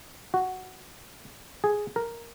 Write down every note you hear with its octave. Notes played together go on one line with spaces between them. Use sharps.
F#4
G#4
A#4